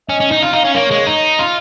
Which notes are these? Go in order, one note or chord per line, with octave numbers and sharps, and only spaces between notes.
C#4 D#5
C#4
D#4
F4 F5
D#4
C#4
A#3 C#5
G#3
D#4 D#5
F4